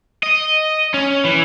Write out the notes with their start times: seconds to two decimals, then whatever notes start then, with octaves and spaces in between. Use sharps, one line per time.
0.23 D#5
0.94 C#4
1.24 E3